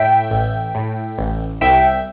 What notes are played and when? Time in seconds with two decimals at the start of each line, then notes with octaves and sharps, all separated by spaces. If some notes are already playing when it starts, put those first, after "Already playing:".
Already playing: A2 E5 G5
0.31 A1
0.75 A2
1.18 A1
1.61 C2 E5 G5